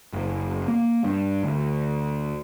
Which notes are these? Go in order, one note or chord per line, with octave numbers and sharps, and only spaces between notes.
F#1
A#3
G2
D2